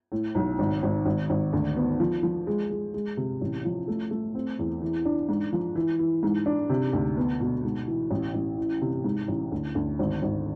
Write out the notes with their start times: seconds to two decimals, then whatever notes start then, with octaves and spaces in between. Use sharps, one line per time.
0.12 A2
0.35 B1
0.59 G#1
0.83 G#1
1.05 G#1
1.30 G#1
1.53 D2
1.76 B3
2.00 F3
2.23 F3
2.47 G#3
2.71 G#3
2.94 G#3
3.17 C3
3.41 A1
3.65 F3
3.88 A3
4.11 A3
4.35 C4
4.59 E2
4.82 E3
5.05 D4
5.29 G#2
5.53 F3
5.75 E3
5.99 E3
6.23 G#2
6.46 D4
6.69 C3
6.93 D2
7.17 B3
7.41 B2
7.63 G#2
7.88 E3
8.11 A1
8.34 A1
8.58 E3
8.81 C3
9.04 G#2
9.28 A1
9.52 D2
9.75 D2
9.99 G#1
10.22 G#1